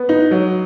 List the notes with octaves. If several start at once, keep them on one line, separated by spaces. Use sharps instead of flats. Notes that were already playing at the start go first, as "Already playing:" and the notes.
Already playing: B3
D#4
F#3